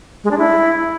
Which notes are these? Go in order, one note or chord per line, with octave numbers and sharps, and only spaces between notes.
G#3
D4
E4